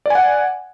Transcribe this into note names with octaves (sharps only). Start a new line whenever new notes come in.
D5 F#5 G#5